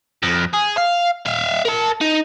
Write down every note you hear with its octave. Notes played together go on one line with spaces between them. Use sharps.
F2
G#4
F5
E5 F5
A#4 A5
D#4